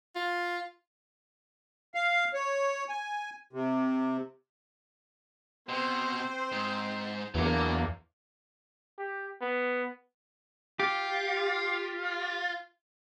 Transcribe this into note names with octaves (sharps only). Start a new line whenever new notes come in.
F4
F5
C#5
G#5
C3
B2 C4 C5
G#2
E2 F#3 A#3 D4
G4
B3
F4 G4